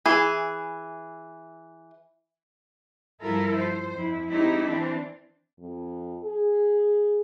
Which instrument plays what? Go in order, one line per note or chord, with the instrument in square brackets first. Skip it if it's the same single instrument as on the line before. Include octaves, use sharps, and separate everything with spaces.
[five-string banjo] E3 G#4
[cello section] G2 F3 E4 F4 A4 A#4
C5
F2 E4
G#3 C4 D#4 E4 G4
E3 C4 D4 C5
[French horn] F2
G#4